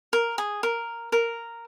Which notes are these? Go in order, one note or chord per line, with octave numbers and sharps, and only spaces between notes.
A#4
G#4
A#4
A#4